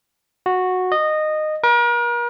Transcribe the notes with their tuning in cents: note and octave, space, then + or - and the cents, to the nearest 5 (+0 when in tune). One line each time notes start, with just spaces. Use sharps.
F#4 -10
D#5 -15
A#4 +40